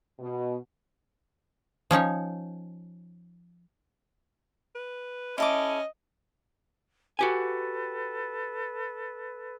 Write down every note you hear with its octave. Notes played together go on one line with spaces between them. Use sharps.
B2
F3 C#4 D#4 C#5
B4
C#4 E4 A4 D#5 D6
F#4 G4 A4 B4 G#5